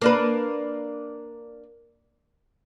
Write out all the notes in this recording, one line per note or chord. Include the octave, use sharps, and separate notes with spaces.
A#3 D4 B4